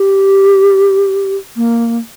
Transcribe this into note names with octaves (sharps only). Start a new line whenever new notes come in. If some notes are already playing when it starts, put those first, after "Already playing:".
Already playing: G4
A#3